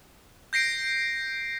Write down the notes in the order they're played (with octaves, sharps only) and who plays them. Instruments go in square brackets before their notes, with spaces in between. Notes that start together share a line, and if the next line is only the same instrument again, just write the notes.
[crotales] G6 A#6 C7 D7